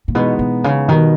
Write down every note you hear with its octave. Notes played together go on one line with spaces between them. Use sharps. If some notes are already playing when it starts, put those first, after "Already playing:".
A#2
B2 E3 G#3 B3 D#4
B2
C#3
B2 D#3 G3 B3